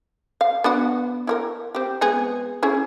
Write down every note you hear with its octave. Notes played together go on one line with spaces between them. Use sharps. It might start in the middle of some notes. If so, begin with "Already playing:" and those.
F5
B3 D4 F#4
E4 G4 A#4
C4 G4
G#3 B3 G#4
C#4 E4 G#4